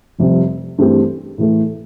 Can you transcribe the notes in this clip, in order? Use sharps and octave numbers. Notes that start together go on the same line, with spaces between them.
F1 F2 C3 G3 C4
G2 E3 A3 C4 G4
A2 E3 A3